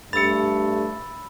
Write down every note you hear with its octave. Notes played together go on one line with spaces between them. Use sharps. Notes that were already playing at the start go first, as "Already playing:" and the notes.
G2 A3 D4 B5 E6 A6 C#7